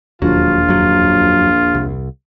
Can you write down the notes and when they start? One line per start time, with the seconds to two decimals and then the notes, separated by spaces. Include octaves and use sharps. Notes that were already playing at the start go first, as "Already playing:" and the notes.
0.22 E1 A#1 D#2 F#3 F4
0.69 F#2 F#3
1.74 C2